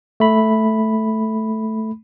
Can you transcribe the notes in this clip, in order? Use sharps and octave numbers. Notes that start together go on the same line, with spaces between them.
A3 B5